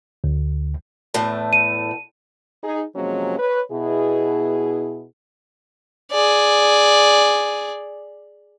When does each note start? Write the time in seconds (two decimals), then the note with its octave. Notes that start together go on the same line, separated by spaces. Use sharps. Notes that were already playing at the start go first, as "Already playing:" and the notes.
0.24 D2
1.14 E2 A2 A3
1.53 D#7
2.64 D#4 G#4
2.96 C3 F3 F#3 G#3 A#3 C#4
3.39 B4 C#5
3.72 B2 E4 G#4
6.12 G#4 D5